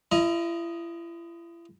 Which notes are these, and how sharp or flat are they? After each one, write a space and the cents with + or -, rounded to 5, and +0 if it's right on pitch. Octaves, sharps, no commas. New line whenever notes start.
E4 +40 D#5 +0 A#5 +25